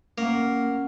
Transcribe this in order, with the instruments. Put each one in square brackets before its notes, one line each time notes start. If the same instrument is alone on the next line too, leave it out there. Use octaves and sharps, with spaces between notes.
[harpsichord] A#3 [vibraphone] C#4 F#5